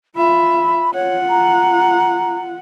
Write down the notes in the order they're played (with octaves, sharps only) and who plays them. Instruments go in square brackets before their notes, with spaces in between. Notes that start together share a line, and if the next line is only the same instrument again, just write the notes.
[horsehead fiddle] F4 E5 [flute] B5
[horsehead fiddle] F4 F#5 [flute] C#5
[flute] A#5